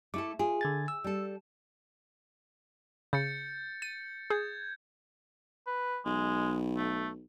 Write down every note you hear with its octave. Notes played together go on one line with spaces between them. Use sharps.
A3 E4 A4 D6
F4 G#4
D3 G#6 A6
E6
G3 A4
C#3 G6 A6 C#7
A6 D#7
G#4 G6 G#6
B4
B1 G#3
A3